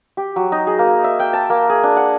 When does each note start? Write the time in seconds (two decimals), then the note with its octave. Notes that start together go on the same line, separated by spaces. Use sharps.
0.17 G4
0.36 F#3
0.52 D#4
0.67 G#4
0.79 A#3
1.04 E5
1.19 G5
1.33 A5
1.50 A#3
1.69 G#4
1.83 D4
1.97 F#5